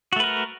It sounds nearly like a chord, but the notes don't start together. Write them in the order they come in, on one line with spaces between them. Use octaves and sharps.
F#4 A3 B4 A#4